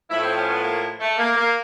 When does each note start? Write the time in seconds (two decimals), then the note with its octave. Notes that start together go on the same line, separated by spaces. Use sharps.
0.09 A2 F3 A3 E4
0.23 C4
0.37 C#4
0.50 B3
0.64 A#3
1.00 A3
1.18 A#3
1.36 A#3